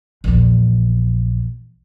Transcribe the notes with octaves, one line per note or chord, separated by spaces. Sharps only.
A#1 E2